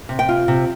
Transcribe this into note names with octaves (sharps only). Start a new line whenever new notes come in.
C3
G5
F4
C3